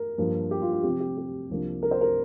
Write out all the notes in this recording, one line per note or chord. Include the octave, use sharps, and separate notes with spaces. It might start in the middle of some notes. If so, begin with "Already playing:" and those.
Already playing: A#4
G2 F3 A#3
G4
F4
F4
C3 F3 C4 G4
G4
G4
C2 C3 F3 A#3 D4
A#4
C5
A#4